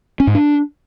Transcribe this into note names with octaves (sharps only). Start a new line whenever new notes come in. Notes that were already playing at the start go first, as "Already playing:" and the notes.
C#4
G#2
D4